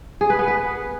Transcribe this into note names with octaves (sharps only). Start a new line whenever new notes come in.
G#4
B4
B3
B4